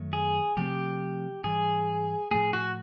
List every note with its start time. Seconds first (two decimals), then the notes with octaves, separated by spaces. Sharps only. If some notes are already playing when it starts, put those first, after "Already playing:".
Already playing: F#2 D#3 F#3 A3
0.13 G#4
0.57 C3 F3 A3 C4 G4
1.44 G#2 E3 G3 G#4
2.31 A2 F3 A3 G#4
2.53 F#4